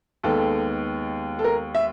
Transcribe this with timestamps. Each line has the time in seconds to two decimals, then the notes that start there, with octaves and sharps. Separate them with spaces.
0.23 D#2 D#3 G#3 B3 A4
1.39 A4
1.44 A#4
1.75 E5